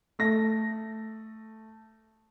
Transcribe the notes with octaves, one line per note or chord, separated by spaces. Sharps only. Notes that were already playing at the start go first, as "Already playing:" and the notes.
A3 A#6